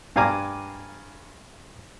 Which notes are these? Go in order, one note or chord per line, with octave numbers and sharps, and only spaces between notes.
G2 F5 G#5 A#5 D6